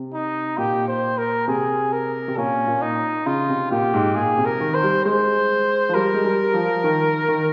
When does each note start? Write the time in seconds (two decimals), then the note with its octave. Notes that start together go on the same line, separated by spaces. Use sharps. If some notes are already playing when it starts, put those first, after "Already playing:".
Already playing: C3
0.14 D#4
0.58 A#2 G4
0.88 C5
1.18 A#4
1.48 C3 G#4
1.93 A#4
2.28 C3
2.37 A#2 C#4
2.67 A#2
2.82 D#4
3.26 C#3 F4
3.49 C3
3.71 A#2 G4
3.93 G#2
4.15 A#2 G#4
4.38 C3
4.46 A#4
4.60 D#3
4.75 C5
4.83 G3
5.05 G#3 C5
5.89 F3
5.94 G3 A#4
6.14 G#3
6.25 G3
6.54 F3
6.84 D#3
7.28 D#3